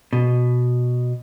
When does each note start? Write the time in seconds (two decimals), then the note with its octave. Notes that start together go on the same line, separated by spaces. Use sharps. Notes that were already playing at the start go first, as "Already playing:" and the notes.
0.13 B2